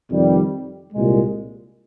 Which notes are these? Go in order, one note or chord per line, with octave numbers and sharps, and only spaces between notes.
F2 C3 D#3 G3
C2 A#2 G#3